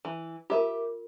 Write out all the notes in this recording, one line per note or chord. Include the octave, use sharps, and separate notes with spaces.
E3
F4 G4 A#4 E5